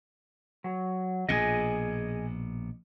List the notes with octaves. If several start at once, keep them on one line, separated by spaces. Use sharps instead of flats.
F#3
A#1 B2 G#4 D#5